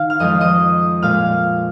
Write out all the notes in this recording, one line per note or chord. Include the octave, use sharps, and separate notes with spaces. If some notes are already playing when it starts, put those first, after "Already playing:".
Already playing: D#3 F5
F6
F2 F3 G#3 D#5 D#6
D#5 D#6
A#2 G#3 F5 F6